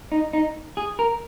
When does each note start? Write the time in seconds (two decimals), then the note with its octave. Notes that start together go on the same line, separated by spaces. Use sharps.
0.12 D#4
0.33 D#4
0.77 G#4
0.99 A#4